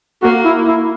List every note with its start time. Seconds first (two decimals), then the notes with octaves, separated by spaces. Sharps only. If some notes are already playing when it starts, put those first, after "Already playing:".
0.23 A#3 F#4
0.45 E4
0.68 E4